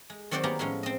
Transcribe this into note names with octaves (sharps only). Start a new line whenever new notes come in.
G#3
D#3 F#3 C4 D5 F#5 G5
A#3 B3 G4 G#4 A#4
A2 F3 G#3 C#4
C4 D#5